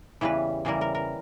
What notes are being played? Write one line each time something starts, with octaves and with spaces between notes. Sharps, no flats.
E2 C#3 E3 G3 B4
E2 C#3 E3 G3 A#4
A#4
A#4